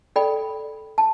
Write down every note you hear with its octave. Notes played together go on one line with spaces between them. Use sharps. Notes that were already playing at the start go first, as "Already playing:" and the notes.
A4 D5 G5 B5
A5